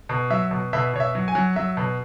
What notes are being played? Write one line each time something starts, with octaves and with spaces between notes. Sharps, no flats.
B2
F#3 E5
B2
B2 E5
B2 C#5
E5
F#3
G#5
F#3
F#3 E5
B2